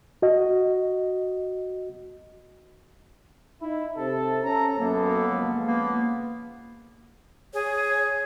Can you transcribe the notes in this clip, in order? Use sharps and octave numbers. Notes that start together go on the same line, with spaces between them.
F#4 D#5
D#4 E4
C3 A4
C#4 A4 A#5
F#2 A#3 B3 A4
C#2 F3
A#3 B3
G#4 C#5